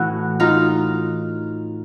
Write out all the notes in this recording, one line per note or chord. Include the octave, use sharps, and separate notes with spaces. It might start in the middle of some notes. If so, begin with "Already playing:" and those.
Already playing: A2 E3 E4 F#4
D#4 F4